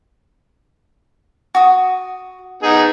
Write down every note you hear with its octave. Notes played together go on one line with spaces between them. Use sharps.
F#4 D#6
B3 D#4 G#4